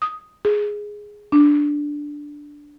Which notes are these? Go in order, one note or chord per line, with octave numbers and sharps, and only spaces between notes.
D#6
G#4
D4